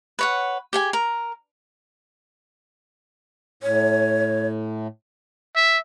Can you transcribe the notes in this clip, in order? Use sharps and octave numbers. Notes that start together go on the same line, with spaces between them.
B4 C#5 F#5
G4 G#4 G#5
A#4
A2 C#5
E5